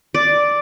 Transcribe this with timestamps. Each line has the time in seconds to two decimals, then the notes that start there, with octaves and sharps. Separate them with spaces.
0.14 D5